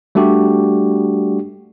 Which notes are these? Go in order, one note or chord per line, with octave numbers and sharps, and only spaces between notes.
G3 A3 D4 F#4 G4